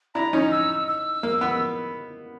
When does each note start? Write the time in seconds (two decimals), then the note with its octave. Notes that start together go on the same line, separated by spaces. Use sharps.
0.15 D4 E4 A#5
0.33 C#4 D#4
0.52 E6
0.88 E6
1.23 A#3
1.41 B3